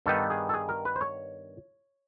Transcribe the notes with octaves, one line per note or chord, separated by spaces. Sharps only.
G2 D#3 G3 B3 D#4 A4
G#4
A4
G#4
A#4
B4
C5
C#5